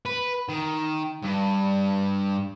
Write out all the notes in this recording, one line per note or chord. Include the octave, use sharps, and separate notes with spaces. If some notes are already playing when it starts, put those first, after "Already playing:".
B4
D#3
G2